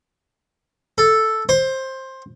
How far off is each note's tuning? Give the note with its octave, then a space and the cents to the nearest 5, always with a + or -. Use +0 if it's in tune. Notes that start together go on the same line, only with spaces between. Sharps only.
A4 +0
C5 +15